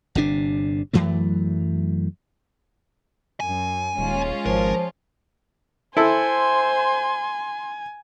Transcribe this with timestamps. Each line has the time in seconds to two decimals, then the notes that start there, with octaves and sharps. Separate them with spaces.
0.15 G1 C3 D4
0.93 F#2 E3 F#3 A3
3.40 F#2 G#5
3.98 D#1 G#3 C#4 F4
4.46 G#1 F3 A#4
5.97 E4 A4 C5 G#5 C6